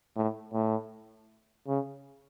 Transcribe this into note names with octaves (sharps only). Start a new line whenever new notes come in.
A2
A2
C#3